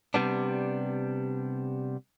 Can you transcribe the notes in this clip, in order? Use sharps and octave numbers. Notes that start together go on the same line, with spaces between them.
C3 G3 B3 D4